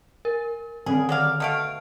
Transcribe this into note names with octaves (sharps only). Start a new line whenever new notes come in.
A#4
D3 D#3 C4 G#4
F#3 D5 F5
B2 A3 F5 F6 D7